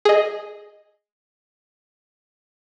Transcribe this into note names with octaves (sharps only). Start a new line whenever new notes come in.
G#4 D#5